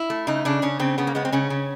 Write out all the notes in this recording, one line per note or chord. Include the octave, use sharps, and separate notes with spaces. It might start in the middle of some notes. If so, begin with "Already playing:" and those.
Already playing: E4
A3
C#3 D#4
C#3 D4
C#3 C#4
C#3 C4
C#3 B3
A#3
G#3 B3
C4
C#3 C#4
C#3